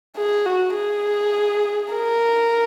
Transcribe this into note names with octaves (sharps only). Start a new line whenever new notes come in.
G#4
F#4
G#4
A#4